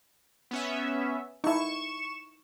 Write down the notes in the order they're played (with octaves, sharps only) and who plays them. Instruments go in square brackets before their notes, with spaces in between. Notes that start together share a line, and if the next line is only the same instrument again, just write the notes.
[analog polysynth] B3 C#4 E5
[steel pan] D#4 E4 [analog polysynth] C#6 E7